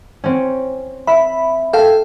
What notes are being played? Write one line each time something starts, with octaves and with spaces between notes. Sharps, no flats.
C4 C#4
E5 B5
A4 F5 G5